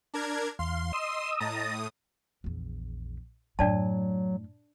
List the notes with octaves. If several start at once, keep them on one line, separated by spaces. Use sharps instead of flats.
D4 A#4 G#6
E2 F5 C6
D#5 D#6 E6
A2 D#5 A5 A#5 D#6
A#1 E2
F#2 A2 F#3 D4 D5 A5